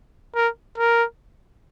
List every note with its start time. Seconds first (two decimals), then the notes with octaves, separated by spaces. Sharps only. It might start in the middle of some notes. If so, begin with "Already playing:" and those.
0.35 A#4
0.78 A#4